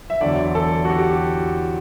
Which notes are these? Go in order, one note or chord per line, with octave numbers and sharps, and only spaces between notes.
E5
E2 D3 F#3 D5
A4
F#4
G4